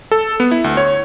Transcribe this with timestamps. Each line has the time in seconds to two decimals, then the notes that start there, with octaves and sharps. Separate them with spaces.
0.11 A4
0.40 B3
0.51 E4
0.64 D2
0.77 C#5